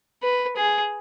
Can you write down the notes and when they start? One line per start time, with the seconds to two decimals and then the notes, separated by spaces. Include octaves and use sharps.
0.23 B4
0.56 G#4